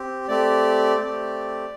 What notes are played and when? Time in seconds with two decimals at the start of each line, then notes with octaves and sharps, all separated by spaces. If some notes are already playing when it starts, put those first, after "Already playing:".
Already playing: C4 G4
0.28 A3 C4 G4 D5
0.99 A3 C4 G4